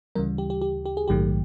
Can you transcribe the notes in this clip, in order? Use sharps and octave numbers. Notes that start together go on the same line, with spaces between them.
D2 C#3 E3 G3 A#4
G4
G4
G4
G4
G#4
A#1 G#2 D#3 F#3 A3 G4